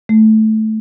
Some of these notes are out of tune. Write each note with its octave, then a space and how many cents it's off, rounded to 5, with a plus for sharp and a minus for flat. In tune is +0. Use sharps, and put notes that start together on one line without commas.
A3 -10